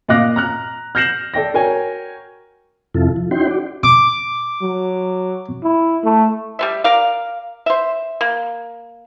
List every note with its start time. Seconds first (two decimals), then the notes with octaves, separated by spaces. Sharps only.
0.08 A#2 D#5 F5 D6 F#6 A#6
0.36 A#5 F6 F#6
0.95 F6 G6 A#6 C7 E7 F#7
1.34 A4 D5 G5 A#6
1.54 F#4 A#4 C#5 G5 G#5
2.94 F2 C3 E4 F4 A4
3.16 F3
3.31 C#4 D#4 E4 F#4 G5 C6
3.47 F#4 D5
3.83 D6
4.62 F#3
5.63 E4
6.04 A3
6.59 G3 B3 E5
6.84 A#4 D5 F5
7.66 C5 E5
8.21 A#3